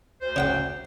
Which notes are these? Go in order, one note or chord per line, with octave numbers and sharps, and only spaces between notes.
D2 C5
C#3 F#5 G5